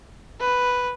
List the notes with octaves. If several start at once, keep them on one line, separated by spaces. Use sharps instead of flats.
B4